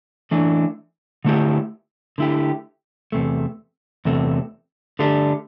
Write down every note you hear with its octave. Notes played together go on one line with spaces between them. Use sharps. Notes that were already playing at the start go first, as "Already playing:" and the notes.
E3 A3 D4
D3 A3 E4 G4
D3 A3 E4 G4
E2 C3 A3
E2 C3 A3
D3 A3 D4 G4